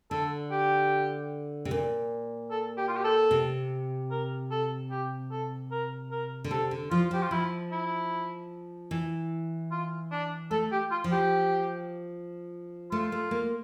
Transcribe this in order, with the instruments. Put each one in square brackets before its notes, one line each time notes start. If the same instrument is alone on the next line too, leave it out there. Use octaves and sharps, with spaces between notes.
[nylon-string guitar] D3 [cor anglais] A4
[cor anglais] G4
[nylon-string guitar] C3
A#2
[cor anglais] A4
G4
F4
G4
A4
[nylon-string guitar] C3
[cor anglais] A#4
A4
G4
A4
A#4
A#4
[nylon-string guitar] D3
[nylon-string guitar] C3 [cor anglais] A4
[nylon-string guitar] D3
[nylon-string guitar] F3 [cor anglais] F4
[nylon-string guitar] F3 [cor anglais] G4
[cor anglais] F4
[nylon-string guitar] F3 [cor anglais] E4
[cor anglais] E4
[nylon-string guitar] E3
[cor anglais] F4
D4
[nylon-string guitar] A3 [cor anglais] A4
[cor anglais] G4
F4
[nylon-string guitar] F3
[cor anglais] G4
[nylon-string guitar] A3 [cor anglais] F4
[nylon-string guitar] A3
A#3